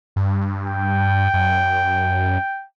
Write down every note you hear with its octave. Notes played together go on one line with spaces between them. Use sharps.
G2
G5
F#2